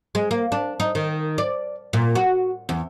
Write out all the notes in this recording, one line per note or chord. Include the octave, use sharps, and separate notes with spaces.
G#3
A#3
D4
D#4
D#3
D5
A#2
F#4
E2